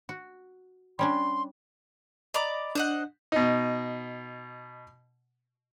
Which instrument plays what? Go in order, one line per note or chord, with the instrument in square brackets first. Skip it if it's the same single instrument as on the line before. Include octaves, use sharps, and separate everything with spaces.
[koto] F#4
[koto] G3 C#4 D4 [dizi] C6
[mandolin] D5 A#5 D6 [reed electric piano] D#5 B5
[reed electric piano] D4 [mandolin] C5 D#5 F#5
[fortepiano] B2 D#4